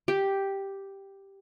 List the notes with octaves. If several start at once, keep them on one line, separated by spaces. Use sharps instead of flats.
G4